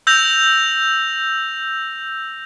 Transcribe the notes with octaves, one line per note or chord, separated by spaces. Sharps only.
E6 G6 A#6 F7